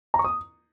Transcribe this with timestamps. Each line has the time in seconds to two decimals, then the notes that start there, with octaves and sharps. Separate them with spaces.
0.14 A#5
0.19 C#6
0.24 D#6